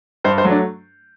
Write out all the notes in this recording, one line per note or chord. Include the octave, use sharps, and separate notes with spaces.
G2 C5
C5
F#3 A3
D4